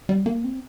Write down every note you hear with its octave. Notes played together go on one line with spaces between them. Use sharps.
G3
A#3
C4